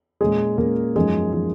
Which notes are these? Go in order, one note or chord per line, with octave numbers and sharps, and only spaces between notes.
A#2 G#3 C#4 G#4
A#2 G#3 A#3 C#4 A#4
F#2 F3 G#3 D#4 G#4
F3 G#3 D#4